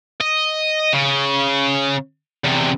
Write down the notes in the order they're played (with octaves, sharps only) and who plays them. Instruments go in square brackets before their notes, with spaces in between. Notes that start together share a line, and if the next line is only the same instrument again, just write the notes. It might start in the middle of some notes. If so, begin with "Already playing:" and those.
[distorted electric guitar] D#5
C#3
E2 C3